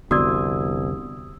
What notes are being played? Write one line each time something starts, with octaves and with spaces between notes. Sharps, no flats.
F1 C2 D3 B3 F#4 D5 D#6 E6